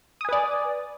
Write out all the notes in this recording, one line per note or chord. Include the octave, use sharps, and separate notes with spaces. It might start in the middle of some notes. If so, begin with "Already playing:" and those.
B4 D5 G#5 D#6